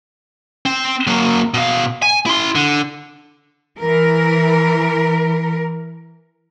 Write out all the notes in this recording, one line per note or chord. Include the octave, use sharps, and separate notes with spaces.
C4
F#3 A#3
B2 F5
G#5
E4 C6
D3
E3 A#4